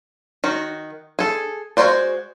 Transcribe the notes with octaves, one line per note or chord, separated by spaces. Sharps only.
D#3 F#4
G#4 A4
G#3 F4 F#4 C5 D5